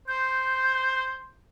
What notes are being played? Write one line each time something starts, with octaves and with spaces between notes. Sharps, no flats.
C5 G6